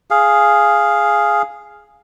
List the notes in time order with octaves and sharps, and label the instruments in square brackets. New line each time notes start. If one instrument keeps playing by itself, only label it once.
[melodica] G#4 F5